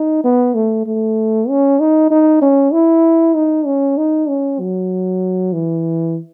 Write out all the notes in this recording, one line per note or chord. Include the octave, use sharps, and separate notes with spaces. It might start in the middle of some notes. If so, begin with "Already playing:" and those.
Already playing: D#4
B3
A3
A3
C#4
D#4
D#4
C#4
E4
D#4
C#4
D#4
C#4
F#3
E3